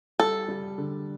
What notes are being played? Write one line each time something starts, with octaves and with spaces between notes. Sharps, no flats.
G3 A4
G3
D3